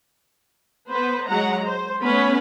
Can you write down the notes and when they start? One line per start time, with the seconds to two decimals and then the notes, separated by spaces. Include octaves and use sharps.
0.88 B3 B4 C5
1.27 F#3 G#3 F#5 A#5
1.64 C5
2.02 A3 B3 C#4 B4 B5